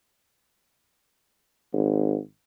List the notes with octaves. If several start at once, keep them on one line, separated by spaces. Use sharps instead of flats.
G#1